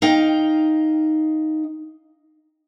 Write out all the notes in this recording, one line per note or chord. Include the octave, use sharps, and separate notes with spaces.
D#4 F5 G5